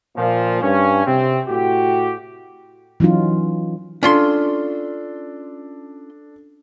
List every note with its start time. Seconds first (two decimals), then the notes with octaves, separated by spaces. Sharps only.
0.16 A#2 F3
0.62 G2 C#4
1.05 C3 C4
1.47 A2 F#4 G4
3.00 E3 F#3 C#4 D#4 F4
4.03 C#4 D4 F4 A4 C6